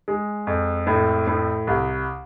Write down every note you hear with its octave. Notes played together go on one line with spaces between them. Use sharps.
G#3
F2
A2
A2
C2